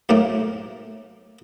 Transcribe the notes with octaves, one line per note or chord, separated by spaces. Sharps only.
B1 A2 A3 A#3